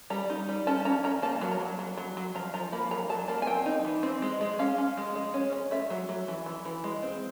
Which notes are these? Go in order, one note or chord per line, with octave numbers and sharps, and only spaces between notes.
G3 A#5
D#4
G3
C#4 A5
C#4 A#5
C#4 A#5
A#3 A5
F#3
A#5
F#3
F#3
F#3
F#3
F3 A#5
F3 A#5
A#3 B5
F#3 A#5
F#3 A5
A#3 A5
G#5
C4 G5
D#4
E3
C4
G#3
G#3
C#4 F5
C#4
G#3
G#3
C#4
C#4
A3 E5
F#3
F#3
E3
E3
E3
G#3
C4